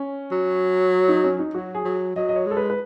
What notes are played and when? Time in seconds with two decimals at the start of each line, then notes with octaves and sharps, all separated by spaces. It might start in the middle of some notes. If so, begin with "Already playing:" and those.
Already playing: C#4
0.32 F#3
1.08 D#4
1.24 C#4
1.39 D#4
1.54 F#3 F#4
1.75 G#4
1.85 F#3
2.16 F#3 D#5
2.29 D#5
2.36 C#5
2.46 G#3 A4
2.57 B4
2.70 B4